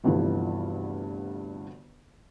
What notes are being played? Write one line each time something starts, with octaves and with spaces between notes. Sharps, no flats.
G1 D2 G2 C3 E3 F3